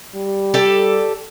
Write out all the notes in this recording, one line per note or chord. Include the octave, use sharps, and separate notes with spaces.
G3
G4 A4 D5